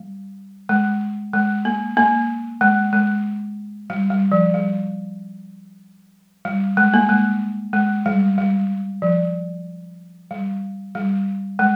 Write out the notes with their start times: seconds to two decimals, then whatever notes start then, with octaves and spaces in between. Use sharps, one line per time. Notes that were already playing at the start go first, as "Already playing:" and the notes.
Already playing: G3
0.69 G#3
1.33 G#3
1.65 A#3
1.97 A#3
2.61 G#3
2.93 G#3
3.90 G3
4.10 G3
4.32 F3
4.54 G3
6.45 G3
6.77 G#3
6.94 A#3
7.09 G#3
7.73 G#3
8.06 G3
8.38 G3
9.02 F3
10.31 G3
10.95 G3
11.59 G#3